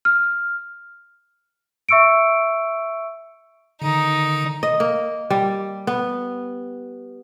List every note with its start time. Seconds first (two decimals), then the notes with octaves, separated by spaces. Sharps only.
0.05 F6
1.89 E5 C#6 E6 C#7 D7
3.82 D3 D#3 D#4
4.63 D#5
4.80 A#3
5.30 G3
5.87 B3